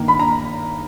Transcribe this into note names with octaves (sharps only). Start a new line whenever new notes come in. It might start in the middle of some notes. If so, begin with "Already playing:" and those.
Already playing: G2 D#3 A#3 D#4
B5
A#5